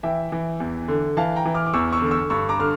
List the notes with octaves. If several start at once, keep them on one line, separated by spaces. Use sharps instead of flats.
E3 E5 G5
E3
E2
D3
E3 F5 A5
G5 A#5
E3
D6 F6
D6
E2 C#6 E6
C#6 E6
D3
C#6 E6
G2 C#6 E6
A#5 D6
D3 F6